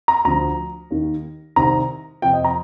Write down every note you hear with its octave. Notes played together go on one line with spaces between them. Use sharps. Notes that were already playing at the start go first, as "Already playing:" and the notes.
A#5
D2 D3 F3 A#5
D#2 D#3
C2 C3 D#3 A#5
F2 C3 F3 G5
D#5
A#5